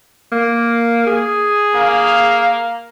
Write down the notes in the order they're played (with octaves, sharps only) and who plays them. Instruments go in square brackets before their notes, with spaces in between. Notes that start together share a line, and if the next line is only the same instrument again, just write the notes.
[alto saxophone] A#3
G#4
[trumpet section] A#3 F5